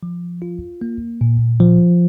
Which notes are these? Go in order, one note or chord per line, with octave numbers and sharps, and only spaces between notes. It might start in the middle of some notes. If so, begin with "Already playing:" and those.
F3
F4
A#3
A#2
F3